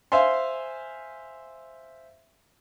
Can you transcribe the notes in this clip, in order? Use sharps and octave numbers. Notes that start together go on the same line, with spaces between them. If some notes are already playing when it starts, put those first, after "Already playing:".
C5 E5 F5 G#5 C6